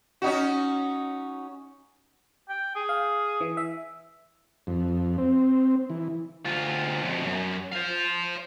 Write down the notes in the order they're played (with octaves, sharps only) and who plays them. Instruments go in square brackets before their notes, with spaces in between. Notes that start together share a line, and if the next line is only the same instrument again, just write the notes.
[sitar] C#4 D#4 F#4
[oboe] G5
G#4
[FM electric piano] F5
E3
E5
[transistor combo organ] F2
C4
E3
[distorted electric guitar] D2 F4
F2 B2
F#2
C5 F5